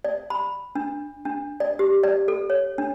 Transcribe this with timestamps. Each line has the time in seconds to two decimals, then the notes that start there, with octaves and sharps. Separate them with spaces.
0.05 D5
0.30 B5
0.75 D4
1.25 D4
1.60 D5
1.79 G4
2.04 D5
2.28 A4
2.50 C#5
2.78 D4